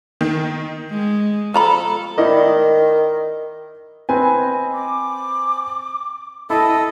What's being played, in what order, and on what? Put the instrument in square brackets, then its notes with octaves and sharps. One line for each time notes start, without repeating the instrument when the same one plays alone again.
[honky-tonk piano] D#3
[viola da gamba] G#3
[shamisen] F3 A#5 B5 [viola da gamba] A4
[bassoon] D#3 [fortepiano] E4 D5 D#5
[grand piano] C4 B4 G#5 [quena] D#5
[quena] D6
[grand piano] E4 [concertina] A4 [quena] D#5